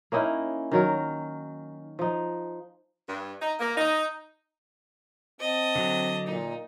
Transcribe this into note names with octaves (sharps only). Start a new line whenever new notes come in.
A#3 C#4 D#4 E4
D#3 F#3 A#4
F3 D#4
G2
D#4
A#3
D#4
C4 D#5 A5
D3 F#3
A#2 D#4